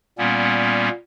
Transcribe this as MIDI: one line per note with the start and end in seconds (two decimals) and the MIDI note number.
0.18 0.89 46
0.18 0.89 55
0.18 0.89 58
0.18 0.89 59
0.18 0.89 61